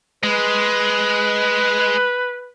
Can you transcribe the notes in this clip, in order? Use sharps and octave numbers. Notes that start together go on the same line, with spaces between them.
G#3 B4